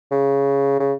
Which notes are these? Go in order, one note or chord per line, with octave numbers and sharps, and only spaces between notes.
C#3
C#3